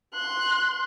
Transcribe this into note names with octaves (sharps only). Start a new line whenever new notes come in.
C6 F#6